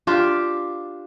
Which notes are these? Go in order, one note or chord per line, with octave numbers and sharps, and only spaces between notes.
D4 F4 G4